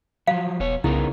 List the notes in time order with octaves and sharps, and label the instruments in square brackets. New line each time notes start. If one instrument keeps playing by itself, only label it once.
[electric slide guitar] F3 F#3 [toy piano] F5
[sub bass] E1 [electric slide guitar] B3 C#5
[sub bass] C2 [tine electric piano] C#3 [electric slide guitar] B3 D#4 A#4 [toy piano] E4